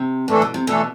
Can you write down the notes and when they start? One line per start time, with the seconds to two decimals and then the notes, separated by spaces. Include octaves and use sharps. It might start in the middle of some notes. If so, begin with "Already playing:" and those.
Already playing: C3
0.28 A2 E3 A3 D4 A4
0.42 B2
0.54 C3
0.67 B2 E3 A3 D4 A4